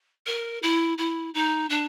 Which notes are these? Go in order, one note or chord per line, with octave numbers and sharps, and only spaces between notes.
A#4
E4
E4
D#4
D4